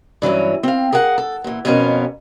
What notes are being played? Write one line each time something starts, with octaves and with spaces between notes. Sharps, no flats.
G2 E3 F#3 C#4
C4 F5
G#4 A#4 F5 F#5
A4
A#2 E3
F2 B2 B3 C#4 A#4 F5